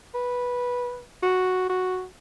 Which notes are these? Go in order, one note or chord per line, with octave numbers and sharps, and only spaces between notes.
B4
F#4
F#4